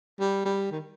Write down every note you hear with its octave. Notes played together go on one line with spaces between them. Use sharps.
G3
G3
D#3